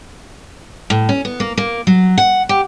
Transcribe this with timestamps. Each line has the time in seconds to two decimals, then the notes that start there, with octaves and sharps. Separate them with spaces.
0.90 A2
1.09 C#4
1.25 B3
1.40 A#3
1.57 A#3
1.87 F#3
2.18 F#5
2.49 G4